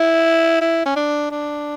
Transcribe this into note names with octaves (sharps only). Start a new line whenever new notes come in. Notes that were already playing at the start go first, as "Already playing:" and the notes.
Already playing: E4
E4
C#4
D4
D4